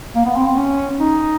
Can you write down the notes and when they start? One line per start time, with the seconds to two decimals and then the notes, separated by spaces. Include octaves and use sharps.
0.16 A#3
0.25 B3
0.36 C4
0.47 C4
0.57 C#4
1.00 D#4